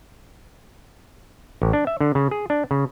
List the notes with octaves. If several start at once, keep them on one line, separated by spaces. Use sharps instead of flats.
A1
D4
E5
D3
C#3
G#4
D4
C#3